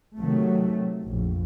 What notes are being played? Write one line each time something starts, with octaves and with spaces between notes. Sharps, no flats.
C3 D#3 F#3 A3
A#1 F2